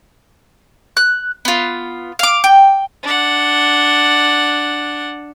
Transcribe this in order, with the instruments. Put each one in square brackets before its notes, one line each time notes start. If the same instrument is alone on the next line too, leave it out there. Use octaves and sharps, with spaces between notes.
[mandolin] F#6
B3 F4
F5 D6
G5
[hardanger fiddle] D4 F#5